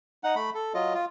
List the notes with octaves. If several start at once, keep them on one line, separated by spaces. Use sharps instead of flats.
D#4 F#5
A3 B5
A4
F#3 F4 D#5
F4